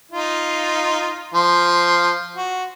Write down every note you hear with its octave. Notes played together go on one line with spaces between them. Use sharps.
D#4 F4
F3 C6
F#4